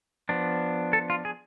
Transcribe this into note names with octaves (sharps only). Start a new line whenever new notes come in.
F3 B3 D4
A4
F4
G#4